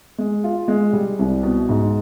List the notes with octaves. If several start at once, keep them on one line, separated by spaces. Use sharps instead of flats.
G#3
F4
G#3
G3
C2
B2
G#2